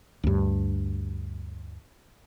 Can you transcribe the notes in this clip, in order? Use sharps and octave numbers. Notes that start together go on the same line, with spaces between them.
D2 G2